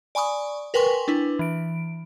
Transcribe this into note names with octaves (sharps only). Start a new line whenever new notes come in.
D5 G#5 B5 C#6 D#6
A#4 B4 G5 G#5 C6 C#6
D4 E4 B4
E3 D7